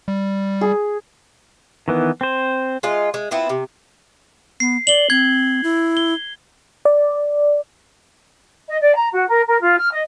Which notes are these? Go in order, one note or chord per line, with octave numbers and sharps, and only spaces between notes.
G3
G#4
D#3 E3 B3
C4 C5
G#3 F4 D#5
G#3
B3 C4 E4 F4
C3
B3 C7
D5 F#7 G7
C4 G#6
E4
G7
D5
D#5
D5
A#5
F#4
A#4
A#4
F4
F6
D#5